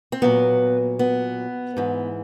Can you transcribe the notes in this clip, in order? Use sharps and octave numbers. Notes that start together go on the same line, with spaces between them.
C4
A#2 F#3 B3
B3
G#2 E3